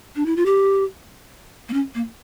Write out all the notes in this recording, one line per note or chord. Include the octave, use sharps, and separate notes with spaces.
D4
E4
F4
G4
A#3
C#4
A#3